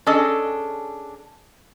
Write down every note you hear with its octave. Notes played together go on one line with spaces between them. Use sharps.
C#4 D4 G#4 A4 D#5